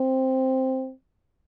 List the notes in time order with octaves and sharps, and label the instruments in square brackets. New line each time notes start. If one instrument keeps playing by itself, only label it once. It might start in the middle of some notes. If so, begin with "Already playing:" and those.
Already playing: [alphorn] C4